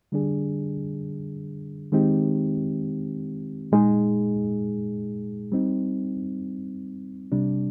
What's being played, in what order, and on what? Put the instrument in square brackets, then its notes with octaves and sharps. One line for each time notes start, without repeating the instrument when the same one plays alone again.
[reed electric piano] D3 G3 D4 G#4
D#3 G#3 C4 D#4 G4
A#2 G#3 D#4 G#4
G3 C4 D#4
C3 G3 D4